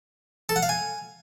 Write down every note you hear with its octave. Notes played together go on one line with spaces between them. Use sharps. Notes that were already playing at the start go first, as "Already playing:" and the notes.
A4
F#5
F5
G#5